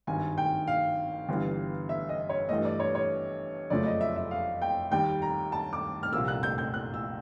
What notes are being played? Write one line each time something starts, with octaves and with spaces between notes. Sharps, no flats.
G#1 G2 D#3 G#5
G5
F5
G1 G2 E3 G3
E5
D#5
C#5
G2 E3 A3 D#5
D5
C#5
C#5
F#1 F2 C#3 F3 A3 D5
D#5
E5
E5
F5
G5
D#2 D#3 G3 G5
A#5
A5
D6
F6
C2 A#2 F3 A#3 E6
F#6
G6
G6
F#6
E6